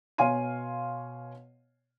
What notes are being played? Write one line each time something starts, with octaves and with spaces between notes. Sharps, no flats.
B2 C#5 F5 G#5 C6 D#7